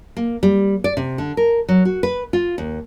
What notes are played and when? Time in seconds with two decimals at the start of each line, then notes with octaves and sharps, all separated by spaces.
0.17 A#3
0.43 G3
0.84 D5
0.97 C3
1.18 D3
1.37 A#4
1.69 F#3
1.85 F#4
2.03 B4
2.33 F4
2.58 D#2